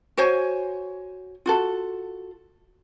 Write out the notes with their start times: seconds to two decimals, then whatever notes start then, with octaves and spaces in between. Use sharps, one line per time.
0.17 F#4 C5 C#5 G#5
1.46 F4 F#4 A4